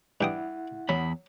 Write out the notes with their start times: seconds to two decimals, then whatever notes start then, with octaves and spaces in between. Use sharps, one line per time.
0.21 G2 E4 F#5 G5 D#6
0.89 E2 F#3 B5